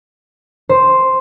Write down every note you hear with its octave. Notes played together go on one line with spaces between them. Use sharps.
C5